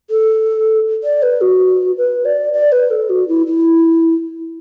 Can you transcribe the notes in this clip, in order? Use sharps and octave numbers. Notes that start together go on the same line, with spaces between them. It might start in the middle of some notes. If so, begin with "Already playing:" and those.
A4
D5
B4
F#4
B4
D5
D5
B4
A4
F#4
E4
E4